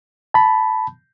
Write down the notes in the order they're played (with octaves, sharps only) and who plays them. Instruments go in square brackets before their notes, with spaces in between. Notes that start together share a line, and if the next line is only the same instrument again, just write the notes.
[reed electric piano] A5 B5